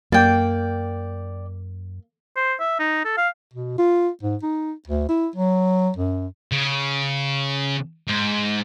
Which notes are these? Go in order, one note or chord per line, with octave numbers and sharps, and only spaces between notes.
F#2 A#3 D5 G5
C5
E5
D#4
A4
F5
B2
F4
G#2
D#4
D2
E4
F#3
F#2
C#3
G#2